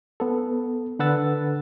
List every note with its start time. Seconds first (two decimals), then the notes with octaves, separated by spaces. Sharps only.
0.20 B3 A4
0.99 D3 A4 B4 F#5 E6 A6